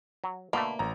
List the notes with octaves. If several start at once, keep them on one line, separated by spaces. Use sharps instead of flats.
F#3
B2 D3 A3 A#3 B5
A1 A#5